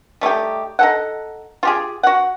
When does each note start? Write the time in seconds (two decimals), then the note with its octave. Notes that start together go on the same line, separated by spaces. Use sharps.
0.21 G3 A3 D#4 G4
0.79 D#4 A4 F#5
1.63 F4 G4 G#4
2.03 F#4 F#5